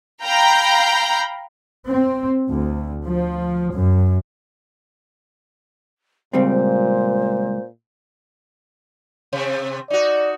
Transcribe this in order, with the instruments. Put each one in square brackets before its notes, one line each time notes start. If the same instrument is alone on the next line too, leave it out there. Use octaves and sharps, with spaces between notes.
[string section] F5 G5 A#5 B5 G6
[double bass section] C4
D2
F3
F#2
[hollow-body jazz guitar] C#2 G3 C4 [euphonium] A#2 [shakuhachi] C5
[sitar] C3 C4
[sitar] D#4 F#4 [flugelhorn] D5